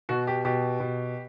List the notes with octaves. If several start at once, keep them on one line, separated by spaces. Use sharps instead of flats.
B2 F#4
G4
B2 G4
B2